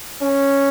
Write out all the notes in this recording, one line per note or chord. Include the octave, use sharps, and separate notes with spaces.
C#4